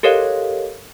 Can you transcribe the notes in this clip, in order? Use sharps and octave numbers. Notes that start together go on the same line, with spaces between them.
G4 A4 A#4 C#5 D#5 F5